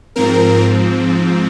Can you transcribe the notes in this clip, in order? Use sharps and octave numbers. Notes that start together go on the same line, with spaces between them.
G#2 F3 C4 A#4